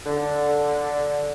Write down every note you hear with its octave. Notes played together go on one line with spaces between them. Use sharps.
D3